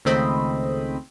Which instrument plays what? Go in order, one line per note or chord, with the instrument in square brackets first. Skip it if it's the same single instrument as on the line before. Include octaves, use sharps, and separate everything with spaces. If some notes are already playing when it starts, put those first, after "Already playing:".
[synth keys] C#2 D#3 A3 C4 D#5 B5